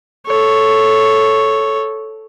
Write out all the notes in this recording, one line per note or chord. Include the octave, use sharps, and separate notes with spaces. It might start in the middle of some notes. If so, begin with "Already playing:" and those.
A4 C#5